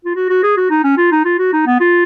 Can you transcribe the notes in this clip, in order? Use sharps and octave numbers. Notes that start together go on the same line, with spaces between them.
F4
F#4
F#4
G#4
F#4
D#4
C#4
F4
D#4
F4
F#4
D#4
B3
F4